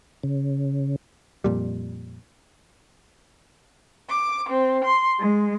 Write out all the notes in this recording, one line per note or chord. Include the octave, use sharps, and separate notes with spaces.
C#3
F2 A#2 G3
D6
C4
C6
G#3